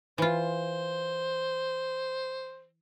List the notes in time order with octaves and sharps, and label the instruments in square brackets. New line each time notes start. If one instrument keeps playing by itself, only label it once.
[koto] E3 F4 [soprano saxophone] C5